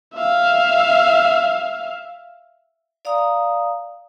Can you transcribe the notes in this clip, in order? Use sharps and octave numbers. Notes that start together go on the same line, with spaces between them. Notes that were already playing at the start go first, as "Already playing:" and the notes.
E5 F5
D5 F5 A#5 D#6